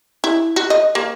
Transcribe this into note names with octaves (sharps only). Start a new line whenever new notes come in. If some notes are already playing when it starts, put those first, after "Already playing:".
E4
F#4
D#5
A#3